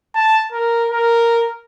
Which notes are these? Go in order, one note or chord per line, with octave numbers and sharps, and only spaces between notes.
A5
A#4
A#4